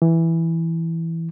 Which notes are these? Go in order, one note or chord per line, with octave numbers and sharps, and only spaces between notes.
E3